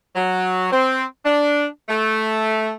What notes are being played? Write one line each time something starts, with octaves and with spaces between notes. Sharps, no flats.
F#3
C4
D4
A3